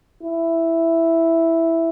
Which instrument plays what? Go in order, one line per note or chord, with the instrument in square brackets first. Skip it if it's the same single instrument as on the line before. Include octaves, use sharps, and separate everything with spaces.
[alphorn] E4